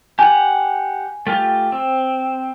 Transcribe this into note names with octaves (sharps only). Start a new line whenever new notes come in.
G4 F#5 G#5
A3 F4 G4
C4